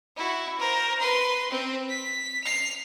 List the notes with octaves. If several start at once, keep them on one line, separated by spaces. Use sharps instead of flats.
E4 F#4
A#4 C5
B4 C6
C4
B6
C7 F7